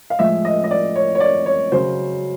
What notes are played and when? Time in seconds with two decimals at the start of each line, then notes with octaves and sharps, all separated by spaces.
0.10 F5
0.19 A2 F3 G#3 E5
0.45 D#5
0.64 D#5
0.71 D5
0.96 C#5
1.15 C#5
1.20 D5
1.46 C#5
1.72 C#3 F#3 C5